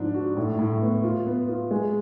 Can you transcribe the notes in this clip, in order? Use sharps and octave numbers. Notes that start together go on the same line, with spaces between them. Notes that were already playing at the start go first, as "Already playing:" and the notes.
Already playing: G#2 F3 D4
F#4
A2
A2
B3
F4
B3
F4
G#3